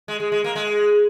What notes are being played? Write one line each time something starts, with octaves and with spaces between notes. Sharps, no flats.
G#3
G#3
G#3
A#3
G#3